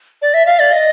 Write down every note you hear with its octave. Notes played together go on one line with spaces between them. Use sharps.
D5
E5
F5
D5
D#5